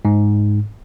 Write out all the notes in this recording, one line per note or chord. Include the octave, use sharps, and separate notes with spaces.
G#2